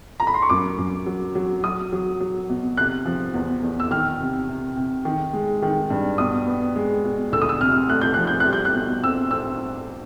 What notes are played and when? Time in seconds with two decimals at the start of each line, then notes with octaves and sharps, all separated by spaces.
0.20 A#5
0.27 B5
0.34 C6
0.42 C#6
0.49 F#2 D6
0.78 F#2
1.06 F#3
1.35 F#3
1.64 F#3 D#6
1.92 F#3
2.21 F#3
2.49 B2
2.77 C3 F#6
3.06 F3
3.34 E2
3.63 E2
3.80 E6
3.91 D#3 F6
4.20 C3
4.49 C3
4.77 C3
5.05 D#3
5.33 G#3
5.62 D#3
5.90 G2
6.18 B2 D#6
6.47 B3
6.76 G#3
7.05 B2
7.32 D2 E6
7.42 D#6
7.49 E6
7.60 C3 F6
7.89 A3 F#6
8.01 G6
8.14 F3 F#6
8.27 G6
8.40 F#6
8.45 G3
8.53 G6
8.65 F#6
8.74 B2
9.03 C4 E6
9.31 C4 E6